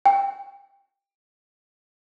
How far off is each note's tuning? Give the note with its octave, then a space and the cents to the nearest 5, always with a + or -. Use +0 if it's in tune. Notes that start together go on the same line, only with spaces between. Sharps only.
G5 +20